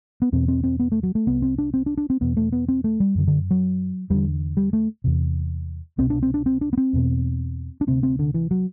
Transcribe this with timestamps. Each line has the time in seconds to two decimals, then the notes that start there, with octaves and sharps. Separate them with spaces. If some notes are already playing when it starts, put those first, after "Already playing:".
0.22 B3
0.32 E2 B2 C4
0.48 C4
0.64 C4
0.80 B3
0.92 A3
1.03 F#3
1.15 A3
1.27 C2 C3 B3
1.42 C4
1.58 D4
1.74 C4
1.86 D4
1.97 D4
2.10 C4
2.21 E2 B2 B3
2.37 A3
2.52 B3
2.68 C4
2.84 A3
3.00 G3
3.15 F#2 D3
3.27 D3
3.51 F#3
4.10 E2 D3 G3
4.57 G3
4.73 A3
5.04 E2 C3
5.98 C2 B2 C4
6.10 D4
6.23 C4
6.34 D4
6.46 C4
6.61 D4
6.73 B3
6.78 C4
6.93 E2 B2
7.81 D4
7.87 D2 C3 C4
8.03 C4
8.19 D3
8.34 E3
8.51 F#3